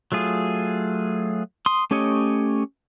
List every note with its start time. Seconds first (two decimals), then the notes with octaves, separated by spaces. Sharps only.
0.12 F#3 A3 F4 G#4
1.66 C6 D#6
1.91 A3 C#4 G4 C#5 D#5